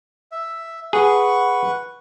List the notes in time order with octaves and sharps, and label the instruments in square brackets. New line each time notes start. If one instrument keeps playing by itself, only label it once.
[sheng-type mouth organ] E5
[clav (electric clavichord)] G#4 [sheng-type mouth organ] B4 F#5 C#6